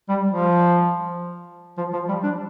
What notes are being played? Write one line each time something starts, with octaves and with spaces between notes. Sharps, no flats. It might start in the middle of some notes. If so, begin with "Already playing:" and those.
G3
F3
F3
F3
G3
D4